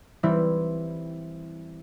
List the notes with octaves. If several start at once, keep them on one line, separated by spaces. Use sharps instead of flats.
E3 G3 C4 E4